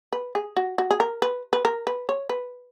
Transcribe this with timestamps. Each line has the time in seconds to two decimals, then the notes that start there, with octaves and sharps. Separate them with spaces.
0.12 B4
0.35 G#4
0.57 F#4
0.78 F#4
0.91 G#4
1.00 A#4
1.22 B4
1.53 B4
1.65 A#4
1.87 B4
2.09 C#5
2.29 B4